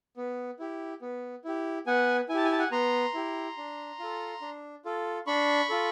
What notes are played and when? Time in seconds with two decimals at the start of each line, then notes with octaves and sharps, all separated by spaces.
0.17 B3
0.59 E4 G4
1.01 B3
1.44 E4 G4
1.87 B3 F#5 G#5
2.29 E4 G#5
2.34 G4 A5
2.44 G#5
2.52 A5
2.58 F#5 G#5
2.72 B3 A#5 C6
3.14 E4 G4
3.57 D4
3.99 F4 A4
4.42 D4
4.85 F4 A4
5.27 D4 B5 C#6
5.70 F4 A4